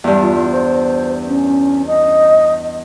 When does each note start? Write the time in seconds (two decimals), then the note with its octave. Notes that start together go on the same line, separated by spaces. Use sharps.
0.04 E2 G2
0.22 F4
0.52 C5
1.28 C#4
1.87 D#5